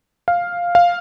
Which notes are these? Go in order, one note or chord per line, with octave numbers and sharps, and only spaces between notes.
F5
F5